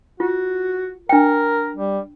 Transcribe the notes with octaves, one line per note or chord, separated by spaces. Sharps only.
F4 F#4
D4 A#4 G5
G3